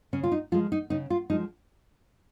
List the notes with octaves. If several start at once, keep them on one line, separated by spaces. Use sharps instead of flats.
C#3 C#4
F4
D#4
F3 G#3 F4
D#4
C#3 D#4
F4
F3 G#3 D#4